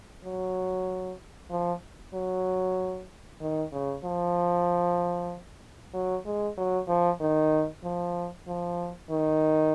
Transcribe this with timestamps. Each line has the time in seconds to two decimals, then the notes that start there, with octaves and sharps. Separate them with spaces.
0.24 F#3
1.51 F3
2.14 F#3
3.41 D#3
3.72 C#3
4.04 F3
5.94 F#3
6.25 G#3
6.57 F#3
6.88 F3
7.21 D#3
7.84 F3
8.47 F3
9.10 D#3